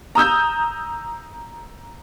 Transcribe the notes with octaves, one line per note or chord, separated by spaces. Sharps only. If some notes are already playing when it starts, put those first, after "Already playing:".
A#5 D#6 E6 G6